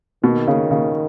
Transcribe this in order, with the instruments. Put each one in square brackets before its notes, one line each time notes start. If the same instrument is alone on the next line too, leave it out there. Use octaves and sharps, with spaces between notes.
[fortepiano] B2 [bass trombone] D#3
[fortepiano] C#3
C#3